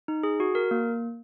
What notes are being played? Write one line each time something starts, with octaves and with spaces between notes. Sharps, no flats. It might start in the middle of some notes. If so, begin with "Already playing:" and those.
D#4
G#4
F#4
A#4
A#3